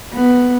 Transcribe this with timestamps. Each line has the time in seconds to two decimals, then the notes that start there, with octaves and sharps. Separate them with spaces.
0.14 B3